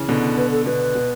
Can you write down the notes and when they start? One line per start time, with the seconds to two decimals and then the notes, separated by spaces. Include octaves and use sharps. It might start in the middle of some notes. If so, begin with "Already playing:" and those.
Already playing: C#3 E3
0.09 B2 D3
0.37 B4
0.52 A4
0.66 B2 D3 B4
0.95 B2